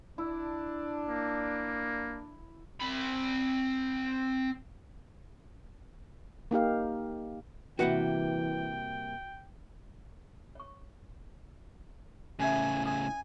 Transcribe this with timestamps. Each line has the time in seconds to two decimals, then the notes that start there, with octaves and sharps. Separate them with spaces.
0.18 D4 E4
1.07 A#3
2.80 C4 B5
6.51 A#3 D#4 G4 F5
7.79 C3 E3 G3 A#3 F#4 B4 F#5 G5
10.55 C#5 C#6
12.39 A2 C#3 C#4 G4 E5 G#5
12.85 C#5 G#5 A#5 D#6